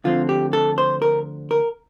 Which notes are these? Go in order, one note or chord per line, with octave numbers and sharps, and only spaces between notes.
D2 D3 F3 C4 F4
G4
A4
C5
A#4
A#4